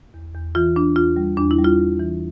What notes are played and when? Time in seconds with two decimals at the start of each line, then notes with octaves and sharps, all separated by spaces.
0.14 E2
0.35 E2
0.55 E3 F4
0.76 E3 D4
0.96 E2 F4
1.16 G3
1.37 E2 D4
1.51 E4
1.58 G3
1.64 F4
1.78 G3
2.00 E3